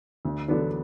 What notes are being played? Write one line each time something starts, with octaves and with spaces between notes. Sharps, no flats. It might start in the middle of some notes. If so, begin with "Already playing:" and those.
D2
D3 F#3 B3 D4